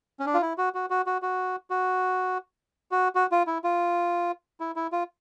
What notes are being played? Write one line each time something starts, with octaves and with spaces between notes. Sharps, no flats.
C#4
D4
F4
E4
F#4
F#4
F#4
F#4
F#4
F#4
F#4
F#4
F4
E4
F4
E4
E4
F4